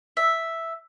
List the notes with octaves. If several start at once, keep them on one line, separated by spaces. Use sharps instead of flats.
E5